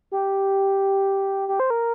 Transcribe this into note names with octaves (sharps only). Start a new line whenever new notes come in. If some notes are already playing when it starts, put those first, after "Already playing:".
G4
G4
C5
A#4